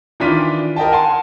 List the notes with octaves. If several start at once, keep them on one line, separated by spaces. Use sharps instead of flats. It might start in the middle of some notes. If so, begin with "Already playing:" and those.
D#3 E3 D4 F4 B6 D#7
A#4 D#5 G5 A5
F#5 G#5 A5 C6